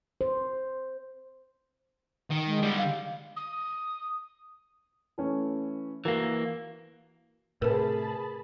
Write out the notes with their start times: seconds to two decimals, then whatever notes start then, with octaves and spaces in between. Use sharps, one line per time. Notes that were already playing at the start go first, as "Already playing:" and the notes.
0.21 C5
2.30 D#3
2.47 G#3
2.63 D3 G3
2.77 F5
3.36 D#6
5.18 E3 A3 C#4
6.05 E3 A#3 F#4 A#4
7.62 A2 C3 G#4 A#4 B4 A5 B5